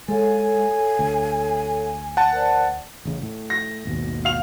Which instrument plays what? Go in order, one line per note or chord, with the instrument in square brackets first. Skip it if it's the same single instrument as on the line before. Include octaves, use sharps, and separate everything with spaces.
[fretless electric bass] G#3 [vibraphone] A4 C#5 F5 [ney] G#5
[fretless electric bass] D2
[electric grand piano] F#5 A5
[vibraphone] A#4 C5 D5
[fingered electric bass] A1 C#3
A2
[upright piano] A#6
[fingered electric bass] G#1 D#2 B2
[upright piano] F5 F7